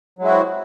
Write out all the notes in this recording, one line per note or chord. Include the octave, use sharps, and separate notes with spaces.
F#3 G#3 C4 E4 F#4